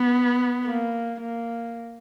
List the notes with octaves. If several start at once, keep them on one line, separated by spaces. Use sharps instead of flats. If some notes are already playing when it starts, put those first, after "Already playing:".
Already playing: B3
A#3
A#3